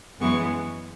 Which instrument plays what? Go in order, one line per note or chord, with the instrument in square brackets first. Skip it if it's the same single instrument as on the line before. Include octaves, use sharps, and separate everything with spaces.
[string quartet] F#2 E3 G#3 B3 C#6